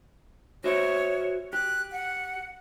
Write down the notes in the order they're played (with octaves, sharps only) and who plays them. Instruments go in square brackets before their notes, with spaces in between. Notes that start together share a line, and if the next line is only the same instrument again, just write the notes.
[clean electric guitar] F#4 C5 E5 [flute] C#5
[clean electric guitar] G4 [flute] F#6
[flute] F#5